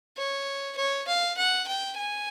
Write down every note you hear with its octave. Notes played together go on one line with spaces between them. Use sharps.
C#5
C#5
F5
F#5
G5
G#5